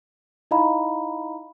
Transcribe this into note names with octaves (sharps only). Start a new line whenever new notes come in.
D#4 E4 D#5 F5 A#5 B5